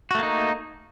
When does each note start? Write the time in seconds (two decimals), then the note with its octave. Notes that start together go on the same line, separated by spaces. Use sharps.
0.11 F#4
0.15 A3
0.19 A#3
0.23 D#4